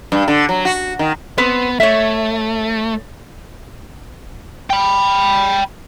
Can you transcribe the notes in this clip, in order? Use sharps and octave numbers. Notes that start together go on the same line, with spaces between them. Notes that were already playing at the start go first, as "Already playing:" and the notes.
G2
D3
F#3
F#4
D#3
B3 C4 B4
A3 C#5 E5
G5 B5